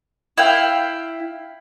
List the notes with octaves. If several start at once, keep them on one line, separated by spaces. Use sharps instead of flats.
E4 F5 G5